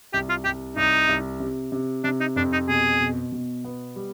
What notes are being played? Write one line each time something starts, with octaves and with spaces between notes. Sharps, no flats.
C2 G4
F4
C2 G4
C2 D#4
C2
C3
C3
C3 D4
D#4
F2 D4
D#4
B2 G#4
B2
B2
B3
G3